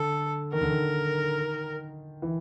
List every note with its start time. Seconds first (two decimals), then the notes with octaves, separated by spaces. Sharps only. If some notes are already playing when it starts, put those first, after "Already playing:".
Already playing: D3 A4
0.53 D#3 A#4
0.61 D3
0.70 D#3
2.22 E3